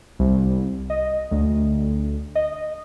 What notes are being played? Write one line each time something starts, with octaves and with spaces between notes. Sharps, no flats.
C2
D#5
D2
D#5